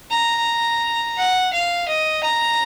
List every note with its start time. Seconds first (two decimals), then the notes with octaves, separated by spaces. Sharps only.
0.11 A#5
1.17 F#5
1.53 F5
1.88 D#5
2.23 A#5